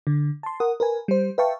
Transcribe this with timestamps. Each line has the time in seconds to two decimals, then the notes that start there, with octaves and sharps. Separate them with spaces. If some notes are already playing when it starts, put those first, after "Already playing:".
0.07 D3
0.43 A5 C6
0.60 A#4 F#5 D#6
0.80 A#4 B4 G#5
1.08 G3 C5
1.38 B4 E5 F5 G5 A5 C#6